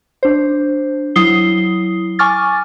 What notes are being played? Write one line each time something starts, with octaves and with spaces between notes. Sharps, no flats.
D4 C5
F#3 E4 D#6 C7 G7
G#5 C#6 D6 F6 A6